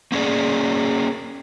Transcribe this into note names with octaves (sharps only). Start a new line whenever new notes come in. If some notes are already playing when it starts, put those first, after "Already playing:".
A#3 C#4 G#4 D5